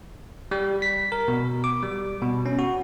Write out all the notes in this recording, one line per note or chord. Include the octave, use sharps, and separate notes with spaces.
G3
B6
A#4
B2
D6
G3
B2
C#4
F#4